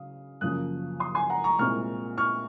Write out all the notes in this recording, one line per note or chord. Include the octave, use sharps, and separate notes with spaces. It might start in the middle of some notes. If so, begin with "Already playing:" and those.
Already playing: C#3 F#3 F5 D#6
F#2 C#3 F3 A#3 D#6 F#6
C6 D#6
G#5 C6
F#5 A#5
A#5 C#6
C2 A#2 G#3 C4 C#6 F6
C#6 F6